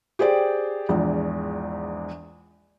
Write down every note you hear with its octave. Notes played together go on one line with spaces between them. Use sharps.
G4 G#4 C5 D5 G5
A#1 E2 G#2